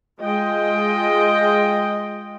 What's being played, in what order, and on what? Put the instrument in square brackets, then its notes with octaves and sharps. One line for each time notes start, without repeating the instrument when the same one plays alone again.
[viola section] G#3 F4 D#5 G5